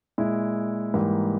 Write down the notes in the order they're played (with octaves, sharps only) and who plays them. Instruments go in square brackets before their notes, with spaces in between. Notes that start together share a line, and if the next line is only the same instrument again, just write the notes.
[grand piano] A#2 G#3 E4
G#2 E3 G3 A#3